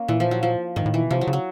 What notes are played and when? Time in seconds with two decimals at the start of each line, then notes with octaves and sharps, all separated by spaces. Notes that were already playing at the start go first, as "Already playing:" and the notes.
Already playing: A#3 C#4
0.08 A#2 E3
0.20 F3
0.31 F#3
0.43 F3
0.76 G#2 D#3
0.86 A2
0.94 A#2 E3
1.02 B2
1.11 C3 F3
1.21 F#3
1.27 C#3
1.33 F#3